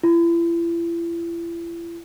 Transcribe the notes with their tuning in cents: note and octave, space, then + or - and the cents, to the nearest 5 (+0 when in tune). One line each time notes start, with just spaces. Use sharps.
E4 +40